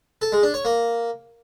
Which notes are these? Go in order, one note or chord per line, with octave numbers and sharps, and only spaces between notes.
A4
G#3
D4
C#5
A#3